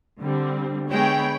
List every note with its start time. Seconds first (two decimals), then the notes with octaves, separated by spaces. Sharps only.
0.20 D3 G3 C4
0.89 D3 G#3 B3 C#5 G5 B5